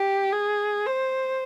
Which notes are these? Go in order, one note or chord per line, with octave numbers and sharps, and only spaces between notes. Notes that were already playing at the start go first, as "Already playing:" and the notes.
Already playing: G4
G#4
C5